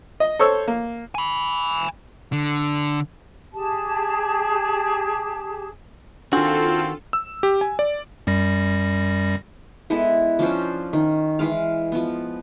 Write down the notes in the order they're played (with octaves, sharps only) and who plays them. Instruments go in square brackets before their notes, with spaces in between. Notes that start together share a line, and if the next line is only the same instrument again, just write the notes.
[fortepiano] D#5
A4 C5 C#5 C#6 E6
A#3
[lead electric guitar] G#5 B5
D3
[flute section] G4 G#4 A5
[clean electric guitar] D#3 F#4 [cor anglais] C4 [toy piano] D4 [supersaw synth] F4 A4
[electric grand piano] E6
G4
G#5
D5
[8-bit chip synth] F#2 G3 A#6
[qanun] G#3 B3 E4 A4
F3 C#4 D4 C5
D#3
E3 G#3 F5
F3 B3